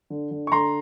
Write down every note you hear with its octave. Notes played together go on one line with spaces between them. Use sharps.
D3
D3
C#6
D3 A#5 C6